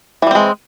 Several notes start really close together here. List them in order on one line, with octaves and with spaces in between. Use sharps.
E3 G3 C4 G#3